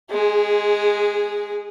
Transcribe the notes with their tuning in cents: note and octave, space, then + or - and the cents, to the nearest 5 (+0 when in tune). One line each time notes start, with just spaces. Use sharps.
G#3 +5 G#4 -20